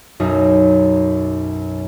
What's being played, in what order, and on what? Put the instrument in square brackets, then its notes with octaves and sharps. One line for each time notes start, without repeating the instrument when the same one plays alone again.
[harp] B1 F#2 D#4